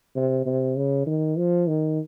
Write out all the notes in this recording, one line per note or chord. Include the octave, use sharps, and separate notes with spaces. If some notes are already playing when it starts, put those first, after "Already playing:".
C3
C3
C#3
D#3
F3
D#3